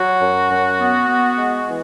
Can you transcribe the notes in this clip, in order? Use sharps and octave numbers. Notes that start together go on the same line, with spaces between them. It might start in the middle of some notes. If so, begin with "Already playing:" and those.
Already playing: F#3 F#4
F#2
F#2
B3
B3
G#3
E3